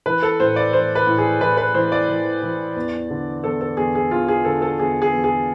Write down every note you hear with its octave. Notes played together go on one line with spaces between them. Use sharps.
E3 B4
A4
A2 C5
D5
E3 C5
B4
A2
G#4
E3 B4
B4
E3 C5
D5
E3
E3
E2
D3
E2 A4
A4
E2 G#4
G#4
E2 F4
G#4
D3 A4
A4
E2 G#4
G#4
E2
G#4